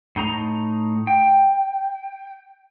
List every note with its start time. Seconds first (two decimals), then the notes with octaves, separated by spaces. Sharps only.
0.16 A2 D#4 A#5
1.07 G5